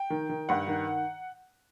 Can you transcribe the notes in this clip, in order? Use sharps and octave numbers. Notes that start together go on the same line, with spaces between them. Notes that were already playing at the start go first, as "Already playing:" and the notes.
Already playing: G5
D#3
D#3
G2 F#5
D#3